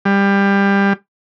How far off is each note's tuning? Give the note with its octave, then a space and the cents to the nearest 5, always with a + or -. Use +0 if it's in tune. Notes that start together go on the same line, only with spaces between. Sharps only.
G3 +20